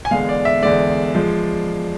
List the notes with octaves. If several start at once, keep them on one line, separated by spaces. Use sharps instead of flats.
G#5
E2 D3 G#3 F5
D5
E5
E2 D3 G#3 D5
F3 G#3